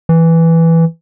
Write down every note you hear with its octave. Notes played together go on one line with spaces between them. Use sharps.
E3